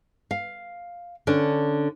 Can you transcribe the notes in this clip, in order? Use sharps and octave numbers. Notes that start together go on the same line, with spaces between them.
F5
D3 C#4 D4